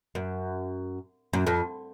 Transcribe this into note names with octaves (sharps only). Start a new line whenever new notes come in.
F#2
F#2
F2